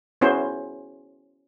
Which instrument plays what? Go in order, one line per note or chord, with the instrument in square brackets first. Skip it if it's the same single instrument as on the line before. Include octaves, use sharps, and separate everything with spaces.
[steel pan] B3 C#4 E4 F#4 G#4 C5